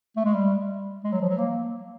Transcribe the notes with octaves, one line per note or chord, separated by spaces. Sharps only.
A3
G#3
G3
G#3
F#3
F3
F#3
A#3